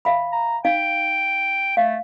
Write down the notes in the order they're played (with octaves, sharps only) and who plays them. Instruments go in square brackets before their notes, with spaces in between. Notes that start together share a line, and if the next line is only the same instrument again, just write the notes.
[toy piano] E5 F5 B5
[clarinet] A#5
[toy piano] D#4 F5 [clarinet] G5
[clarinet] A3 [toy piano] F5